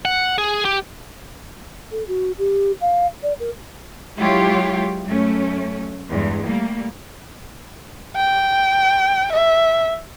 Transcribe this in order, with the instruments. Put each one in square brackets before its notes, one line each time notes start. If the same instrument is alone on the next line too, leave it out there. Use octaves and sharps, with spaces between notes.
[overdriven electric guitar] F#5
G#4
G4
[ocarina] A4
F#4
G4
F5
D5
A#4
[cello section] F#3 G#3 E4 F4 G4 C#5
F#2 A3 C#4
E2 G2 G#3
G3 A3 A#3
[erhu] G5
E5